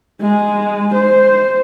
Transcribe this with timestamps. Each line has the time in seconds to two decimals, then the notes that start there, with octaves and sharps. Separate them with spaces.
0.22 G#3
0.95 C5